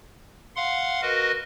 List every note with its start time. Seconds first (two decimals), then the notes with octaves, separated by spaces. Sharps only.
0.56 F5 F#5 C6
1.02 F#4 A#4 B4 D#5